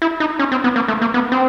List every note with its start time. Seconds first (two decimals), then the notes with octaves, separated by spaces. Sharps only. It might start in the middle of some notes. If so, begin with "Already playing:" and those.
0.02 E4
0.20 D#4
0.39 C#4
0.52 C4
0.64 B3
0.76 A#3
0.88 A3
1.01 A#3
1.14 B3
1.32 C4